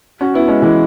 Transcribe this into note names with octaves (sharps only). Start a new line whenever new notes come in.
C#4 F#4
B3 E4
G#3 C#4
E3 G#3